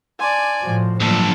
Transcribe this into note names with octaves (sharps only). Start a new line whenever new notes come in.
D5 G#5 A5 C6 D6
A2 F3 F#4
G2 F3 F#3 A#3 D4 A4